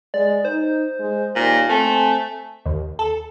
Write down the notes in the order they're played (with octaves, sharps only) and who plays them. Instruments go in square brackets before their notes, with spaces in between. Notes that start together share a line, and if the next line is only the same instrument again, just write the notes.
[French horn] G#3 [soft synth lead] D5
[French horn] D#4 [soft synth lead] C5
[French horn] G#3
[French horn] D#2 [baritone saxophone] A#2
[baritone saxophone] A3 [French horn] C4 [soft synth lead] G#5
[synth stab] D#2
A4